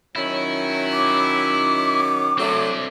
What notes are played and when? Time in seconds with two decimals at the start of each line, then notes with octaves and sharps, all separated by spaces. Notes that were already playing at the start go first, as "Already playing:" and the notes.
0.16 D#3 F#3 C#4 E4
0.92 D6
2.39 F#3 A3 C4 D4 D5